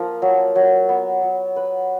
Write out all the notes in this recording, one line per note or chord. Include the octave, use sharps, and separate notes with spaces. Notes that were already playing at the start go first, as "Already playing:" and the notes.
Already playing: F3 A#3 A#4
F#3
F#3
B3
F#3
B4